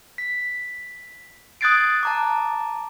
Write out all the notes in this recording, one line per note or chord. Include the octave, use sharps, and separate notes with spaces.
B6
D#6 F#6 G#6 A6 C7 D7
A5 A#5 D6